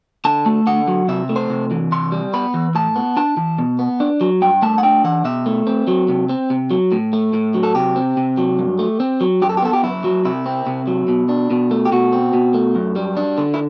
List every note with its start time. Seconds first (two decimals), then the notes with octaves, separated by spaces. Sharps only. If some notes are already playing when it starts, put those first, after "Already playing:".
0.25 D3 A5
0.46 A3
0.67 D3 F#5
0.88 F#3
1.08 C3 E5
1.29 A3
1.36 C5
1.50 C3
1.71 E3
1.92 C3 C6
2.12 G3
2.34 B3 B5
2.54 E3
2.75 A2 A5
2.96 B3
3.17 D4 A5
3.37 E3
3.58 B2
3.79 B3
4.00 D4
4.21 F#3
4.42 G2 G5
4.62 A3 A5
4.78 F#5
4.83 D4 G5
5.04 E3 F#5
5.25 B2 E5
5.46 A3
5.67 C4
5.87 F#3
6.08 C3
6.29 C4
6.50 C3
6.71 F#3
6.92 A2
7.13 A3
7.34 A2
7.54 F#3
7.63 A4
7.75 C3 G4
7.96 C4
8.17 C3
8.37 F#3
8.59 G2
8.79 A3
9.00 C4
9.21 F#3
9.42 F#2 G4
9.49 A4
9.57 G4
9.62 B3 A4
9.73 G4
9.83 F#2 E4
10.04 F#3
10.25 C3 E4
10.46 C4
10.67 C3
10.87 F#3
11.08 B2
11.29 D4
11.50 B2
11.71 A3
11.85 G4
11.92 B2 F#4
12.13 C4
12.33 B2
12.54 A3
12.75 F#2
12.96 G3
13.17 D4
13.38 D3
13.54 E4